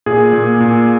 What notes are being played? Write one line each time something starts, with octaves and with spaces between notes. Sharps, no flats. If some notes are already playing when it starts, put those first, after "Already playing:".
A#2 G#4
A#2
A#2